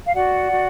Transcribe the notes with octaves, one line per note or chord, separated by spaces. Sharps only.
F5
F#4 D5 F#5
F#4